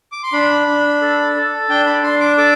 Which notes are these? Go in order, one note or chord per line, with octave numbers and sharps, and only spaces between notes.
D6
C6
D4 B5
D4
A4
A4
D4 G5
B5
D4 C6
D6
A4 D6